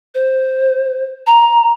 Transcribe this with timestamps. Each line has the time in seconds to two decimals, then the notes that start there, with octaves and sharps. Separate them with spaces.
0.15 C5
1.27 A#5